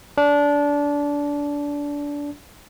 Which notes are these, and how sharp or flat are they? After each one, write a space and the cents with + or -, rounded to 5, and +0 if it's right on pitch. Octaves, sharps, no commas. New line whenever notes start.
D4 -20